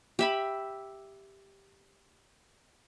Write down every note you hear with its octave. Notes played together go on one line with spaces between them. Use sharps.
G4 E5 B5